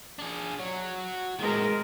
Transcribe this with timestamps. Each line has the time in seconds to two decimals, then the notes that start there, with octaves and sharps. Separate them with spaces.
0.19 D4 G#4
0.59 F#4 C#5
1.39 A2 D#3 G#3 A#4